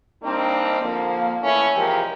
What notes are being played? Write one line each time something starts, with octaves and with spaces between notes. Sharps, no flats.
G3 A#3 C4 D4 D#4
F2 D3 F3 A#3
E3 A3 C#4 E4
C3 E3 F3 G#3 G4 A#4